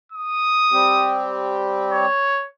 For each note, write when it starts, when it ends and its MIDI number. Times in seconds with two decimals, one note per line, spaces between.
0.12 1.26 87
0.72 2.06 55
0.72 2.06 60
0.72 2.06 67
1.92 2.46 73